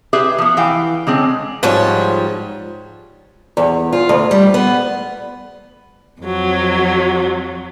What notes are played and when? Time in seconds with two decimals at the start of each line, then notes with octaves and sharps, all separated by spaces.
0.13 G4 G#4 B4 E5
0.38 F3 B3
0.57 E3 F5 G5
1.07 D3 G#3 C4 C#4
1.63 G#2 F3 G3 C#5
3.57 E2
3.93 F4
4.09 D2
4.31 G3
4.54 B3
6.21 F2 F#3